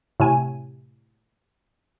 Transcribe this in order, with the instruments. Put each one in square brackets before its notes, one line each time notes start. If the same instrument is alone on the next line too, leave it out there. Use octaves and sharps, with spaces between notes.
[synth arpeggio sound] A2 C3 G#5